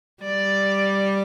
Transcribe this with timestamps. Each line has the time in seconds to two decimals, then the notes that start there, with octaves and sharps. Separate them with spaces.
0.23 G3 D5